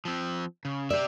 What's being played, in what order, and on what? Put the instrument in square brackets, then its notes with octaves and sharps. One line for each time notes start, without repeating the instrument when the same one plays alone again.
[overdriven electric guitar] F3 C4
C#3
[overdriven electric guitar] G4 E5 [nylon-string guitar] D5